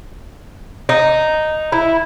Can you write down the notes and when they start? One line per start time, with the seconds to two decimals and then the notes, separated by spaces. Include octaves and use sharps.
0.89 D#4
1.72 E4